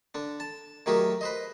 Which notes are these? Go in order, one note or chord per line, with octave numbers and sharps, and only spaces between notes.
D3 D4
A5
D#3 F#3 A3 G4 G#4 A#4
B4 C5 D#5